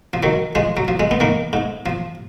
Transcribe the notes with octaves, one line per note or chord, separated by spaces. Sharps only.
F3
D#3 F#3
F3 G#3
F#3
F3
G#3
B3
D#3 A#3
G#2
F3